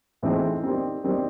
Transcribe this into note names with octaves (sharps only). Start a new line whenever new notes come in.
A2 E3 G#3 C4 D#4
D#3 G3 C4
D#3 G3 C4